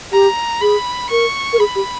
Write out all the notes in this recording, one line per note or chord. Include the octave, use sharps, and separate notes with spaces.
G4 A#5
G#4 B5
A#4 C#6
A#4
G#4 B5
G4